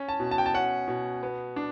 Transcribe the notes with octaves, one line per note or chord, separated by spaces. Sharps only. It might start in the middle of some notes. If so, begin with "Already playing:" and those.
Already playing: C#4
A5
B2
A5
G5
A5
C#4 F#5
B2
B3
D4